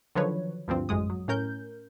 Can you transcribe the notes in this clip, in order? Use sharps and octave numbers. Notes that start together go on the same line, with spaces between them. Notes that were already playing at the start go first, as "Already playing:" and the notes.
D3 D#3 F3 F#3 B4 C#5
D2 G2 F3 C4
A1 F#2 G#3 D#6
F#3
A2 C#4 A#4 G6